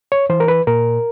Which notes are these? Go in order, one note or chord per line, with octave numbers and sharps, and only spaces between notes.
C#5
E3 C5
A#4
B4
A#2 A#4